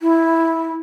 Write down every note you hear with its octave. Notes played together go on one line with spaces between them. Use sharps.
E4